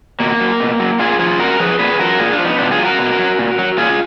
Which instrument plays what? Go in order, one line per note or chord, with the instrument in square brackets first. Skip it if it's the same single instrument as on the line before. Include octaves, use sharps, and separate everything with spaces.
[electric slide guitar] B2 A#3
F#3
B2
F#3
A#2 F4 G#4
F3 F4 G#4
A#2 F#4 A#4
F3 G#4 B4
A#2 G#4 B4
F3 F#4 A#4
A#2 F4 G#4
D4 F4
F3
B3 D#4
B2 D4 F4
F4 G#4
F#3
F#4 A#4
B2
F#3
A#2
F#3
A#2 F4 G#4